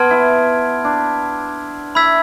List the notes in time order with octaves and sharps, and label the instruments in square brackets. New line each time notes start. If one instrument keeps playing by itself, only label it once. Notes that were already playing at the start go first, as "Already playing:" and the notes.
Already playing: [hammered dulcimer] B3 [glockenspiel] A5 C6 F6 G#6 D7
[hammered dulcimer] E4
D4
[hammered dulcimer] E4 [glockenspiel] B5 E6 G#6 B6